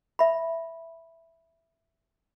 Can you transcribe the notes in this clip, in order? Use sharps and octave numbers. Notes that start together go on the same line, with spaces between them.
E5 B5